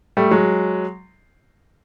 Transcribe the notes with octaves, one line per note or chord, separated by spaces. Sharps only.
G3 A3
F#3 G#3